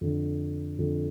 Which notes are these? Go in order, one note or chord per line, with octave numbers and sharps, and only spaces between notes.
F2 D3
F2 D3